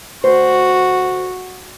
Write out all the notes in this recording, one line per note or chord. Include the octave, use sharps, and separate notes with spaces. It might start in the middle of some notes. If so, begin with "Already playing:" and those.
D2 F#4 C5